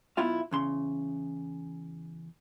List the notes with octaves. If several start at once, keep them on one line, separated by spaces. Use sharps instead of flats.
B1 B3 E4 F4 F5
E2 C#3 C6